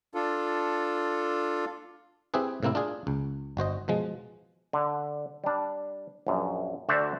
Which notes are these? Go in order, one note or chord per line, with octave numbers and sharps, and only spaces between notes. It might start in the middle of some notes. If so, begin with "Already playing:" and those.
D4 F4 A4
C4 E4 G4 G#4 B4
A2 C3 A#3 C4 E4
D4 F4 G#4
C#2
G1 F#4 C5 D#5
B2 F3 G#3
D3
G3 D4
A#1 F#2
D2 F#4 C5 D5 E5 F#5